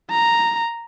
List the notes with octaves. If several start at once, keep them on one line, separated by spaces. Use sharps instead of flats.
A#5